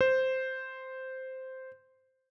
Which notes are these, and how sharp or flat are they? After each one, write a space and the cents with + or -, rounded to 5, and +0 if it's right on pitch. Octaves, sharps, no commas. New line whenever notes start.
C5 -5